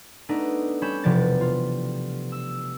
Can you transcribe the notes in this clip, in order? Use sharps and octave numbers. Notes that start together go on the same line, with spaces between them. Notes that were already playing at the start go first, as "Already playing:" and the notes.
A3 B3 D4 D#4
G3 C#4 B5 G6 E7
E1 C3 F3 B3 D5 A6
F4
E6